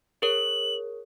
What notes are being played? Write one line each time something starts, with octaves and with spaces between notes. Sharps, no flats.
G#4 A#4 C#5 F#7